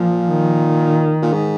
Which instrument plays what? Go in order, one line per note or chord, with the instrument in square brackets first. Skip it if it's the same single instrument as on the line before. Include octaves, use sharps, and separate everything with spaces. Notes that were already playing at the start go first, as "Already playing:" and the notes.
Already playing: [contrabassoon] A#2 [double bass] F3
[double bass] D#3
[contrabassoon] A#2
G#2